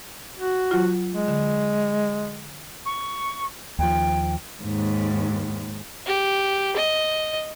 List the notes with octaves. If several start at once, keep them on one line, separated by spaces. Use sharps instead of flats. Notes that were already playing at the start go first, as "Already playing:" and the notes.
F#4
F#3 F4
G#3
D3
C#6
D#2 F3 G5
D#2 G#2
G4
D#5